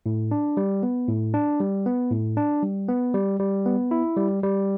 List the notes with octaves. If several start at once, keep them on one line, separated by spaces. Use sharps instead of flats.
A2
D4
G3
B3
A2
D4
G3
B3
A2
D4
G3
B3
G3
G3
B3
E4
G3
G3